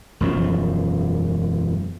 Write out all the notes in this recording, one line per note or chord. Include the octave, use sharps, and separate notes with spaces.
E1 F#2 F3